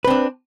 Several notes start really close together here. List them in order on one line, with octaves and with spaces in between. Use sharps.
B4 C4 D4